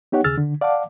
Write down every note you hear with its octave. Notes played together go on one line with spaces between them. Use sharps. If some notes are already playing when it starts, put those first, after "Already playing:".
B3 D#4 G4 C#5 F#5
D#2 C#3 G#4 E6 F6 A6
D3
D5 F5 F#5 A5 D6